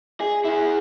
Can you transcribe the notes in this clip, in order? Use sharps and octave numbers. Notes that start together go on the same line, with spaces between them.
G#4
E4 G#4